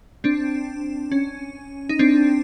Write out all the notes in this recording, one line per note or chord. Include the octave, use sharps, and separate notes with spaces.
C4 D4
C#4
D#4
C4 D4